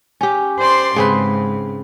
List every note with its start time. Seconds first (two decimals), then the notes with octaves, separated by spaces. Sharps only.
0.21 C#4 G4
0.58 C5 D5 C6
0.96 G#2 C#3 C4 B4